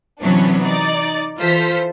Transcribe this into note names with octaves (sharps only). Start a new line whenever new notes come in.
C3 E3 F#3 B3 C#4 D4
D#4 D5
E3 F4 A4 C5 B6